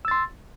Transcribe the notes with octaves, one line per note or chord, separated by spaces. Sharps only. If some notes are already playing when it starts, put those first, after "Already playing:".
C6 E6 A6